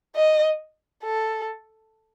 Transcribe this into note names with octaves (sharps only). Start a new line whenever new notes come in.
D#5
A4